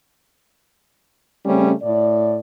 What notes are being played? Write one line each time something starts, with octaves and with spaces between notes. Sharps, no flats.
C#3 G3 A3 C4 C#4
A2 D5